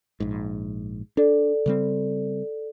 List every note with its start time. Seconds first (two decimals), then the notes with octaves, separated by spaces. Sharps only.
0.20 A#1 G#2
1.17 D4 A4 D5
1.66 C#3 G3 C4